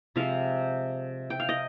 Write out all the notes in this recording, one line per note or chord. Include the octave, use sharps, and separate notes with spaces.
C3 F3 G#3 F5
G5
F5
D#5